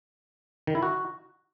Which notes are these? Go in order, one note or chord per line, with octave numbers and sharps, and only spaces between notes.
D#3
E4
F#4